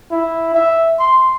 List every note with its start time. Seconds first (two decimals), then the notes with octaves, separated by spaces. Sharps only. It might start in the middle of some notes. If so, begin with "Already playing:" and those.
0.11 E4
0.54 E5
0.99 C6